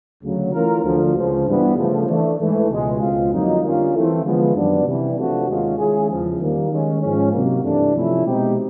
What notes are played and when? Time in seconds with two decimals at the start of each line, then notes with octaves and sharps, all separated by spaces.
0.22 D2 C#3 F#3
0.53 E3 A3 C#4 F4 A#4
0.84 D2 D3 F3
1.15 C#2 C#3 F3
1.45 G2 E3 G3 B3
1.76 C#3 F3 A3
2.08 E3 A3 D4
2.38 G#2 E3 A3
2.69 C#2 B2 G#3
3.00 C#2 B2 G#3 C4 F4
3.31 F2 D3 F#3 A#3 D#4
3.62 D3 G3 A#3 C#4 F4
3.93 E3 A3 C4
4.23 D3 F3 G#3 B3
4.54 F#2 D#3 G3 B3 D4
4.85 C3 E3 G3
5.16 C3 F3 A3 D4 F#4
5.47 D#2 D#3 G#3 C#4 F4
5.78 D#3 G#3 C#4 E4 G#4
6.09 E2 C#3 F3
6.39 D#3 G3 A#3
6.71 D#3 G#3 C#4
7.02 G#2 F3 G#3 C#4
7.32 C3 D#3 F#3 A#3
7.63 G2 E3 A3 D4
7.94 C3 F3 A3 C#4 E4
8.25 B2 G#3 C4 D#4 G4